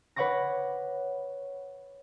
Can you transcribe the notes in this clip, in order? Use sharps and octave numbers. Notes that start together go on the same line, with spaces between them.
B4 C#5 F#5 C#6 D6 A#6